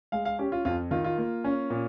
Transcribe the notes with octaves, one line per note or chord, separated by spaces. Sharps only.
G#3 F5
F5
C#4 G4
F4
F2 F4
D#3 F4
F4
A#3
C#4
A#2